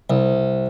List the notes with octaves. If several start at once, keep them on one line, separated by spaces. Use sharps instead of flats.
C2